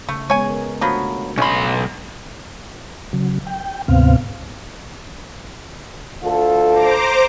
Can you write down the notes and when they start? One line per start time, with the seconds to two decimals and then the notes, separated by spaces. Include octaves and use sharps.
0.09 C#3 A3
0.30 G#3 B3 C#5 G#5
0.50 A#4
0.81 F3 F#3 A3 B3 D4 F#4
1.38 B1 C#4 D#5 B5 C6
3.13 C#3 F#3
3.47 G5
3.88 D2 G#2 C3 B3 C4 F5
6.23 D2 F4 A4
6.71 C5 A#5 D6